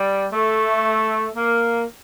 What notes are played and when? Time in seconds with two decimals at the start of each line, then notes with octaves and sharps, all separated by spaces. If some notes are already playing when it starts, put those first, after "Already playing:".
Already playing: G3
0.32 A3
1.36 A#3